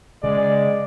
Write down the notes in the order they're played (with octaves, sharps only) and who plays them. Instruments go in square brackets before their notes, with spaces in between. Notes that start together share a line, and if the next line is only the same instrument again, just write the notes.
[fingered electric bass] C#3 [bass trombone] G#3 [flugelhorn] D5